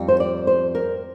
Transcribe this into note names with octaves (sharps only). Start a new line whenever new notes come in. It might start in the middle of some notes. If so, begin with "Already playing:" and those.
Already playing: F2 G3
C5
D5
C5
A#4